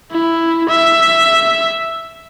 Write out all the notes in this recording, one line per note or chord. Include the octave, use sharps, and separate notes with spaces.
E4
E5